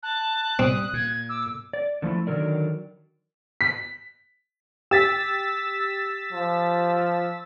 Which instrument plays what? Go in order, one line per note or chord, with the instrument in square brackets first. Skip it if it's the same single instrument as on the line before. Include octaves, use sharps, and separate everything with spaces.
[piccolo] A5 [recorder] F#6
[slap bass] G3 [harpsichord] C4 [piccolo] D#6
[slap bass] A#2 [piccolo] G#6
[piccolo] D6 [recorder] E6
[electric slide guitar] D5
D3 F3 A3 E4
D3 D#3 F3 F#3 A#4 D5
[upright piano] B6
[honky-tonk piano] G4 [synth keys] E6 A6 B6
[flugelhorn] F3